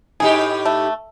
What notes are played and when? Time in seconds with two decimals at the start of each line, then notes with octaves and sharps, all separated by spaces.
0.20 A2 D#4 G4 G#4
0.66 A3